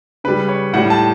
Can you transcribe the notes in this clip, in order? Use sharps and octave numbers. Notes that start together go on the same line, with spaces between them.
C#3 G3 B4
C#5
A2 G3 F#5
A5